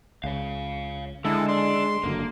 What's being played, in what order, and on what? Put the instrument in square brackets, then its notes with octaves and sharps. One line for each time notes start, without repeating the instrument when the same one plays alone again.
[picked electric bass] C#2 [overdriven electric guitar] C#5 F5
[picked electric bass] D3 [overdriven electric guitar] E3 E4 [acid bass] G#3 [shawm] A4
[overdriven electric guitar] D4 [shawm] C6
[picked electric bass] F#1 D3 F#3 [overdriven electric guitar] A#3